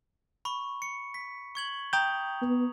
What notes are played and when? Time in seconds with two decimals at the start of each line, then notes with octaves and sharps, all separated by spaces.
0.45 B5 C#6
0.82 C#7
1.14 B6
1.55 C#6 G#6 F#7
1.93 G5 A#5 D#6 G6 F7
2.42 B3